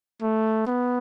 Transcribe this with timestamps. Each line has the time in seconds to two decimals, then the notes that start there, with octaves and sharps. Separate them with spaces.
0.22 A3
0.67 B3